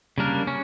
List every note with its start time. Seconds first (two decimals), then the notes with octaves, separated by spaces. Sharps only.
0.18 C#3 G3 A#3 D4 A#4
0.47 C#4